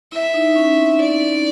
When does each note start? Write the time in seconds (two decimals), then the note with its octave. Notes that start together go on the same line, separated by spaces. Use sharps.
0.12 E4 E5
0.34 D#4
0.56 C#4
0.78 C4
1.00 D5